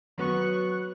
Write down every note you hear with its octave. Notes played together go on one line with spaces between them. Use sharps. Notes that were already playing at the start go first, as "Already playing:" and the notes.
F#3 B3 C#6 F#6